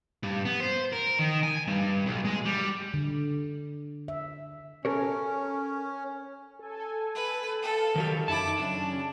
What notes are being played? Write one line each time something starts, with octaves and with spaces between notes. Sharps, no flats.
G2
B3
C5
A#4
D#3
G#5
G2
B1
G#3
G3
D3
E5
C#4 A4 A#4 C#5
A4 G#5
B4
A4 F5
D#3 F#3 G4
F#2 D#4 E4 A5 D6
C#3 F#3 C#4 D4